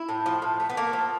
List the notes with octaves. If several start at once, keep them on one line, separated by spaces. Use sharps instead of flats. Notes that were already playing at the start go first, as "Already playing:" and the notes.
Already playing: E4
A2
F3
A2
A3
B3
A3 A#3
F3